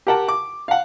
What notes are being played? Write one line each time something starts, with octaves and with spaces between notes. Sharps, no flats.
G4 A#4 F#5 G5 A5
D6
F5 F#5